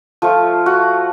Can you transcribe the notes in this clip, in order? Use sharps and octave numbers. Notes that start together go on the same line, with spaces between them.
F3 A3 F4
F#4